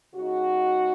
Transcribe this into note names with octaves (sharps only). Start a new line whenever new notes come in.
C#3 G#3 D#4 F#4